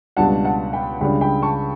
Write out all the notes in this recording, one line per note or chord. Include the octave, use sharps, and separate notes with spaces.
C#2 B2 G3 D4 F#5 A5
F#5 A5
G5 B5
C#2 C#3 G3 D4 G5 B5
G5 B5
A5 C#6